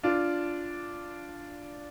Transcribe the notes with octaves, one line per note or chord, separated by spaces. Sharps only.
D4 F4